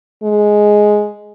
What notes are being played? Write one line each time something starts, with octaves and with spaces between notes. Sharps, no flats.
G#3